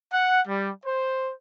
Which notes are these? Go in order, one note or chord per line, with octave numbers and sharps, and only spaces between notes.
F#5
G3
C5